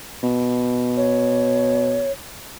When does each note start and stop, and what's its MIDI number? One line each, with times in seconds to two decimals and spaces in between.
0.23 2.08 47
0.97 2.12 73